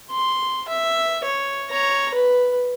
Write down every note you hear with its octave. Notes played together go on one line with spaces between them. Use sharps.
C6
E5
C#5
C#5 A#5
B4